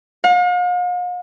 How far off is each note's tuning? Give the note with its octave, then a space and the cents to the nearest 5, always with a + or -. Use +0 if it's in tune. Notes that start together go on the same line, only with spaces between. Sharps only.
F5 +45